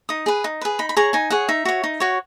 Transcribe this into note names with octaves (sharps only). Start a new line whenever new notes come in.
D#4 D#6
G#4 B4
D#4
G#4 B4
D#4 B5
B5
G#4 C#5 A#5
D#4 G#5
G#4 C#5 F#5
D#4 E5
F#4 C#5
D#4
F#4 C#5